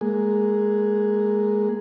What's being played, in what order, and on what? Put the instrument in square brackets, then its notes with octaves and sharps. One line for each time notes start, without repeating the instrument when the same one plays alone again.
[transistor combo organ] G#3 A#3 G#4